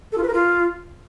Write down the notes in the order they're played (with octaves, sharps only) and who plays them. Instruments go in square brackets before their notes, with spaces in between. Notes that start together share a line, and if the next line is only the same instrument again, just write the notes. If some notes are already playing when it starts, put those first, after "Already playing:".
[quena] A4
F4
B4
A#4
F4